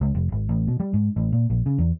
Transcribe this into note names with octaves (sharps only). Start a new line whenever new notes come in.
C#2
F1
G#1
A1
B2
G3
G#2
A1
A#2
A#1
C#3
E2